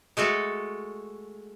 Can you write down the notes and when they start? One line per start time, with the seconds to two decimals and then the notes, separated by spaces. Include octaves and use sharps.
0.17 G#3 A3 F#4 A4